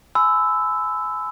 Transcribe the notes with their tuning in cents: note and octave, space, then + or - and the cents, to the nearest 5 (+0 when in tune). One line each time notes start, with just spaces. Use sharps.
G#5 +25 B5 +40 E6 -5